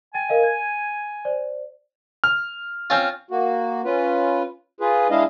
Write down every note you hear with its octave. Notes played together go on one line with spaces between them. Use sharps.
G5 G#5 A6
A#4 D#5 F5
G#6
C5 D5
F6
C4 C#4 F4
A#3 F#4
C#4 F4 B4
F4 G#4 B4
G#3 D4 E4 D#5 F5